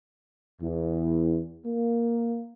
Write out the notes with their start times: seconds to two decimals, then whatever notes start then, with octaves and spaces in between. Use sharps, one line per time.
0.61 E2
1.65 A#3